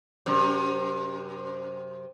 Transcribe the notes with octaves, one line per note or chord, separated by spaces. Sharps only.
F#2 C3